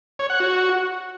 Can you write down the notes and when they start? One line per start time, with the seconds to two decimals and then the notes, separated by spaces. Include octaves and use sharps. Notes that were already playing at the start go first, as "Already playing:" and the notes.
0.19 C#5
0.30 F#5
0.40 F#4